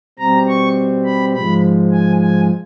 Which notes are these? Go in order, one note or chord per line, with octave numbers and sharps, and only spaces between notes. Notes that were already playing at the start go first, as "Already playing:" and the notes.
B2 G3 C4 A#5
C#6
B5
G#2 F3 G#3 B5
G#5
G#5